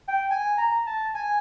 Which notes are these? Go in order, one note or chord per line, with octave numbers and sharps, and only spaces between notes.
G5
G#5
A#5
A5
G#5